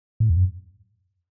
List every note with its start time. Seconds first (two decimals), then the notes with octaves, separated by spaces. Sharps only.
0.20 A2
0.30 E2
0.37 F#2